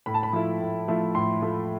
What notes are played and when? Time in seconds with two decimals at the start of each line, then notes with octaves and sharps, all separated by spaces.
0.06 A2 B5
0.14 A5
0.23 B5
0.33 F3 A3 E4
0.61 A2
0.88 F3 A3 E4
1.15 A2 C6
1.42 F3 A3 E4